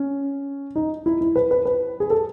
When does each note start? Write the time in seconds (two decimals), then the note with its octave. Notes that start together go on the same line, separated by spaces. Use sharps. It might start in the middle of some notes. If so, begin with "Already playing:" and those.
Already playing: C#4
0.75 D#4
1.06 E4
1.21 E4
1.36 B4
1.51 B4
1.65 B4
2.00 G#4
2.10 A4